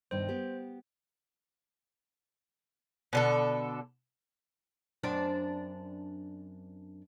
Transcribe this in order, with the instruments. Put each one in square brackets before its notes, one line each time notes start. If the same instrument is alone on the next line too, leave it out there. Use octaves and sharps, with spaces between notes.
[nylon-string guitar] G2 B2 D#3 [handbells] C5
[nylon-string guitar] B3 G4
[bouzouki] B2 D3 A4
[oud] F#2 C4 D4